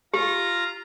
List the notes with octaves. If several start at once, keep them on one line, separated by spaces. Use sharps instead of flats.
F4 G4 A#5